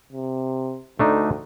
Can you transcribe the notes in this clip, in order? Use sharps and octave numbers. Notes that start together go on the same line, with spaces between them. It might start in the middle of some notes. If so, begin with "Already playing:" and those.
C3
D2 A3 D4 D#4